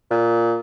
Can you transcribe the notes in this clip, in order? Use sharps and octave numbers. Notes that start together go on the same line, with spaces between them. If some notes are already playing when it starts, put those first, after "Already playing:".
A#2